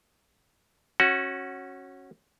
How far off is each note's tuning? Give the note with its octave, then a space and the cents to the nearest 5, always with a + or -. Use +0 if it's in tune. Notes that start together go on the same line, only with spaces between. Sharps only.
C#4 -20 F#4 +0